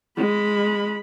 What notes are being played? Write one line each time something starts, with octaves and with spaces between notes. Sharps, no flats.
G#3 B5